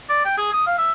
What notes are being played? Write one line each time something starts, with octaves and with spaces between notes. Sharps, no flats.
D5
G5
G#4
D#6
F5
E5